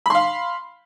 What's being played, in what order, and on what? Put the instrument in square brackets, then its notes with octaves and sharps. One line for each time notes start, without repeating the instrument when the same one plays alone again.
[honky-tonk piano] B5
C6
F5